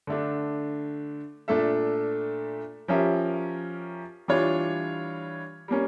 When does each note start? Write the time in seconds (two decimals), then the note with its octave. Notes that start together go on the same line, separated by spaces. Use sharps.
0.07 D3 A3 D4
1.48 A#2 A3 D4 A4 E5
2.88 F3 C#4 G4 A#4 E5
4.28 E3 G3 D4 F4 C#5
5.68 G3 A#3 C#4